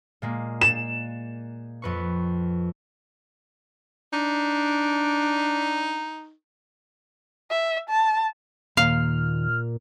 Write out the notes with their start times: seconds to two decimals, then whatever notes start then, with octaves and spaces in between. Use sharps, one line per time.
0.22 A#2 G#3 A#3
0.61 E7
1.82 F2 B4 C#6
4.13 D4 D#4
7.51 E5
7.89 A5
8.77 D#2 A#2 F5 F6